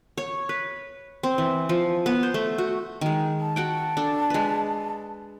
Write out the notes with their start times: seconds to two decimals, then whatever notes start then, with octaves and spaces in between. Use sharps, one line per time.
0.18 C#5
0.49 B4
1.23 C4
1.38 E3
1.69 F3
2.06 B3
2.23 C5
2.34 A3
2.58 F#4
3.01 D#3 G#3
3.41 A5
3.56 F#4 F#5 G5
3.97 D4 A4
4.30 G#3 B4